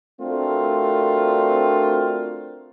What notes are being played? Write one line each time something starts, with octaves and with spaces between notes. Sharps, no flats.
A3 C4 D4 F4 F#4 A#4